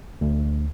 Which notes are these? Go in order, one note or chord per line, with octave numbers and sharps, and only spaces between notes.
D2